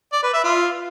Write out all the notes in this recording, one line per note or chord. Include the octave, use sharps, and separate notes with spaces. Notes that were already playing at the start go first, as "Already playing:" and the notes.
D5
B4
E5
F4